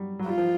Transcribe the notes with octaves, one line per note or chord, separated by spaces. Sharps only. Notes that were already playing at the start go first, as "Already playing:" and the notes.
Already playing: F#3 G3
F#3
G3 F4
F3